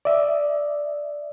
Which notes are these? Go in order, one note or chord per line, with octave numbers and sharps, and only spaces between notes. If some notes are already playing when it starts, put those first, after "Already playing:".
D5 E5